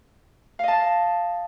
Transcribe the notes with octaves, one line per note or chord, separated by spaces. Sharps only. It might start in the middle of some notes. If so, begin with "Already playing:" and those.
D#5 F5 A5